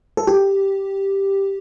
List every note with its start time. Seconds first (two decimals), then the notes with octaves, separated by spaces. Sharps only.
0.17 A4
0.27 G4